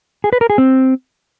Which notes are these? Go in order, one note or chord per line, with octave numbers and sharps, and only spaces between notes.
G#4
B4
A#4
G#4
C4